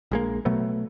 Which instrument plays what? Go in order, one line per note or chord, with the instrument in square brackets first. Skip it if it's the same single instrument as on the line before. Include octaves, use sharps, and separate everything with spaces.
[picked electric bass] A#1 G#3 A#3
B2 F#3 A3 B3